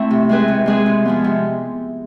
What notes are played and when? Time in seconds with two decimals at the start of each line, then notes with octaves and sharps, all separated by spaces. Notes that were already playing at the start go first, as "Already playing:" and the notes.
Already playing: A3 C4 E4
0.11 C3
0.29 G#3 C4 G#4 B4
0.48 C3
0.66 G#3 C4 G#4 B4
0.86 C3
1.05 F3 G#3 B3
1.24 C3